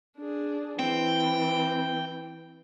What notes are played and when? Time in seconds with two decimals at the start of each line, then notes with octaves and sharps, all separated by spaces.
0.17 D4 G#4
0.79 E3 C4 G5